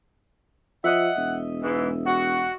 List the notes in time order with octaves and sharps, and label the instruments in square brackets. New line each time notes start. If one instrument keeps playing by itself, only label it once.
[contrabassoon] F3 [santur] D#5 E5 [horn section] F#5
[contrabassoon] E1
[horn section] G#2 E3
F#4